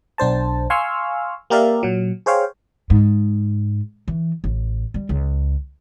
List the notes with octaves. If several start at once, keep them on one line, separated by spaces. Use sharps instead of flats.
B1 D4 C5 A5
F5 G#5 C6 C#6 E6 F6
A#3 G4 A#4 D5 E5 F5
A#2 F#3
G#4 C5 C#5 F5 G5
G#2
E3
A1
G3
C#2